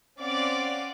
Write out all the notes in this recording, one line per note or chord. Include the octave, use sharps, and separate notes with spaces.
C4 C#4 D5 F5 F#5 D6